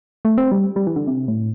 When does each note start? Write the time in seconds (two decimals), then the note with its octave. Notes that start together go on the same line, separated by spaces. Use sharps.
0.25 A3
0.38 C4
0.52 G3
0.76 G3
0.87 E3
0.96 D3
1.07 C3
1.28 A2